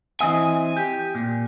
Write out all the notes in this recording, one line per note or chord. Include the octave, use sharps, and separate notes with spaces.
E3 C4 D#5 G#5
G4
A#2